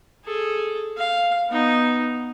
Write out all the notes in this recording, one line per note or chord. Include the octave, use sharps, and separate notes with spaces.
G#4 A4
F5
B3 D#4